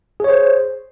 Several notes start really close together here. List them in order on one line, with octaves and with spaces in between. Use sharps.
G#4 C#5 C5